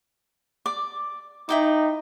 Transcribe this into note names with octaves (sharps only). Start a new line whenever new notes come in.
D5 D6
D#4 E4 G5 D6